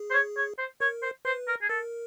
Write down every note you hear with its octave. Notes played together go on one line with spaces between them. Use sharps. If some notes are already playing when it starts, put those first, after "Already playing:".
Already playing: G#4
C5
C#5
C#5
C5
A#4 C#5
C5
B4 C5
A#4
G#4
A4 A#4